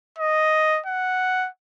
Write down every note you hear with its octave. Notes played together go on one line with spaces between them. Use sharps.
D#5
F#5